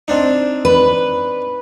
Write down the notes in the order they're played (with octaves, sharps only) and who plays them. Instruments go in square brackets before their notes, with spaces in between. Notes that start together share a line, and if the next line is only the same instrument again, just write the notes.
[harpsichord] C4 D4 D#4
[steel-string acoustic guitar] B4